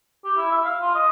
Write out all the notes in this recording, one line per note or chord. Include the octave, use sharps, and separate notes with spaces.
G4
E4
E5
F5
F4
D#5